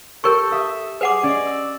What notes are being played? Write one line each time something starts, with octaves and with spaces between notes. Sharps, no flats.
G4 A4 A#4 C#6
E5 D#6
G#4 B4 F#5 D6
C#4 D5 D#5
E6